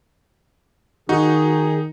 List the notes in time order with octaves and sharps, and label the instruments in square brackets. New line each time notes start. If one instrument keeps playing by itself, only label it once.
[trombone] D#3 [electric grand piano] D#4 [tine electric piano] F#4 [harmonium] G#4